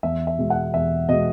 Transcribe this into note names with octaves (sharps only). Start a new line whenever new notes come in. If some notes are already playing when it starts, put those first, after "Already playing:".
E2 E5
E5
B2 G#3
F#5
E2 E5
B2 G#3 D#5